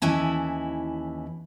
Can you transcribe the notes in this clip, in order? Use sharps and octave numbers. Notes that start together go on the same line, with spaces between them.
D#2 E3 C#4 E4 A5